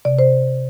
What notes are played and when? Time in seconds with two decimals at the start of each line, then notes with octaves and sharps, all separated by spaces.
0.05 C3 D5
0.19 C5